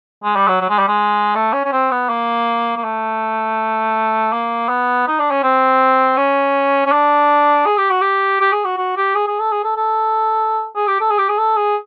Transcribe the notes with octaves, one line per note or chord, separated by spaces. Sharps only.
G#3
G3
F#3
F#3
G#3
G3
G#3
A3
C#4
C#4
C4
B3
A#3
A#3
A3
A#3
B3
D#4
D4
C#4
C4
C#4
C#4
D4
G#4
G4
F#4
G4
G4
G#4
F#4
F#4
G4
G#4
G#4
A4
G#4
A4
A4
G#4
G4
A4
G#4
G4
G#4
A4
G#4